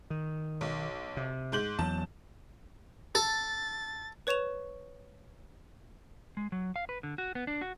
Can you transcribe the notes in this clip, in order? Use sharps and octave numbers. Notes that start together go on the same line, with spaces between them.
D#3
B1
C3
G#2 G6 F#7
E2 F#3 A5
A4 A6
B4 C#5 C#6 E7 F7
G#3
F#3
F5
B4
D3
F#4
B3
D4
F#4